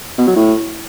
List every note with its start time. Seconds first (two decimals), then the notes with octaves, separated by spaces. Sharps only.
0.18 B2
0.27 F#3
0.36 A2